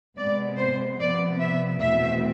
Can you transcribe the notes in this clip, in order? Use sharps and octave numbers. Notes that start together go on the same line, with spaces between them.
C3 G#3 B3 D5
C5
C3 F3 B3 D5
E5
E2 B2 A3 C4 E5